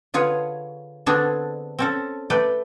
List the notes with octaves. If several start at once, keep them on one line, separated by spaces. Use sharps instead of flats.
D3 F4 G#4 B4 C#5
D3 B3 C4 D4 G#4 A4
C4 C#4 A4
A3 B4 D5 G5